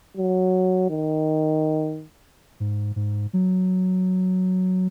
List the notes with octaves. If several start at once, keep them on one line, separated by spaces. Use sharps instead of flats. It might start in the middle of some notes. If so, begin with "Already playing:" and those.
F#3
D#3
G#2
G#2
F#3